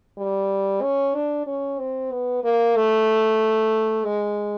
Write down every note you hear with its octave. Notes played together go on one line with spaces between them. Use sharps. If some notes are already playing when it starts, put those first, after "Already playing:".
G3
C#4
D4
C#4
C4
B3
A#3
A3
G#3